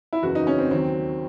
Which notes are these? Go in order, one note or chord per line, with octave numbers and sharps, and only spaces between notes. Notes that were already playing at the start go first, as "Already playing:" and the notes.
E4
F#1 E2 C#3 F#4
D#4
C#4
C4
D#2 D#3 F#3 C4